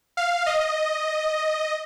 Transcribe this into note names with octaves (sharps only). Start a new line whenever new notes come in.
F5
D#5